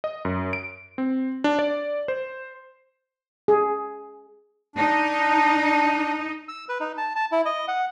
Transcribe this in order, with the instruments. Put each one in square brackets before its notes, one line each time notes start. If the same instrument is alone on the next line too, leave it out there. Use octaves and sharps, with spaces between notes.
[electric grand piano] D#5
F#2
D7
C4
D4
D5
C5
[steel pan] G#4
[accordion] D4 [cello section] D#4
[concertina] E6
B4
D#4
A5
A5
E4
D#5
F#5